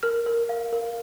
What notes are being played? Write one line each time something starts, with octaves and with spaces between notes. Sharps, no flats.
A#4 F6
A#4
F5
A#4